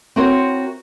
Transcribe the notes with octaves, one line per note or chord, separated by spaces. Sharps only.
C4 E4 F#4 A#4 C5 C#5